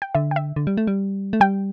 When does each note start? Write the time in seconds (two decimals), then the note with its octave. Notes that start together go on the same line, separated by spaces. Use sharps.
0.02 G5
0.15 D3 E5
0.31 G5
0.36 E5
0.56 D3
0.67 G3
0.77 A3
0.87 G3
1.33 A3
1.40 G3 G5